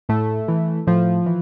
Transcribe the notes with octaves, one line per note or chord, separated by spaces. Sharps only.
A2 A3
E3
A2 F3
E3